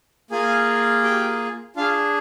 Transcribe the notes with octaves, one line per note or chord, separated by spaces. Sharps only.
A#3 F4 G#4 G#5
G4 G5
D4 F4 G#4 F5